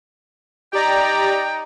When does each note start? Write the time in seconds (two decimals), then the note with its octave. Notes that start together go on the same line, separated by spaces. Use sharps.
0.73 D#4 G4 D5 G5 A#5